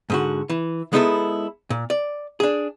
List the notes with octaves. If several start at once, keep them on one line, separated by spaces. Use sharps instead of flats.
G#2 D3 F#4
E3
G#3 B3 D#4 E4 G#4 A4
A#2
D5
D4 G#4